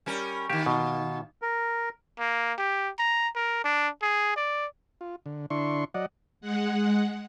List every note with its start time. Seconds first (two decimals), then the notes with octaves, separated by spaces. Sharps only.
0.06 G3 C#4 A#4
0.50 D#3 A#3 G4
0.66 B2
1.42 A#4
2.19 A#3
2.58 G4
2.99 A#5
3.35 A#4
3.64 D4
4.02 G#4
4.36 D5
5.01 F4
5.26 D3
5.50 D3 D4 E4 C6 C#6
5.94 F#3 D5 D#5 F#5
6.41 G#3 F#5